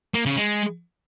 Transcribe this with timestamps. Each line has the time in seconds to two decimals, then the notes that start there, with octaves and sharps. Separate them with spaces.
0.14 A#3
0.26 C#3
0.37 G#3